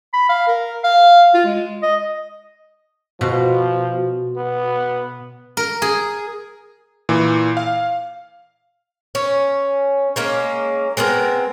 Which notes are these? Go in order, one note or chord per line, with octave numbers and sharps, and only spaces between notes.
B5
F5
A#4
F5
F4
G#3
D#5
B2 F3
B3
A#4
G#4
A#2 E3
F5
C#4
G#3 A#3 C#4
G#3 B3 C4 A#4